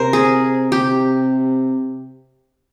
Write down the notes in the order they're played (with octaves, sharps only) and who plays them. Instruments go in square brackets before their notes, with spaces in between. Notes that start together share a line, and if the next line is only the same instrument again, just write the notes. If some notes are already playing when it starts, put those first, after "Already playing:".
Already playing: [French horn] C3 [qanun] A#4 C5
[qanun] G#4
[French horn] C3 [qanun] G4